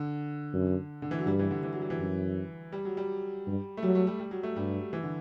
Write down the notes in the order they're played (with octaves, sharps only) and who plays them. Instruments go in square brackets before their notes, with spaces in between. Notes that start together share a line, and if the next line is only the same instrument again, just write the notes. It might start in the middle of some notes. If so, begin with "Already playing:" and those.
Already playing: [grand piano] D3
[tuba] F#2
[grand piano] D3
E3
F#3
[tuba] G2 [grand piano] G3
[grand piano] E3
D3
E3
F#3
G3
E3
[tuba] F#2
[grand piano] G3
F#3
G3
[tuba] G2
[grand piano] A3
[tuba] F#3 [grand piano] G3
[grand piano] A3
G3
G3
F#3
A3
[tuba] G2 [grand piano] G3
[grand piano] E3
D3